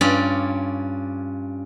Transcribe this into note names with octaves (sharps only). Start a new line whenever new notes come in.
G2 C#4 F4 D5